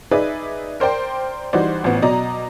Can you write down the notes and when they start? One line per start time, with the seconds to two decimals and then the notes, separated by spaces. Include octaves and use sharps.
0.11 D#4 G#4 B4 D5 E5
0.80 A#4 C5 D5 G5
1.53 E3 G3 D#4 F#4 C5 D5
1.84 A1 F3 B3
2.02 B2 F#3 D5 D#5 A#5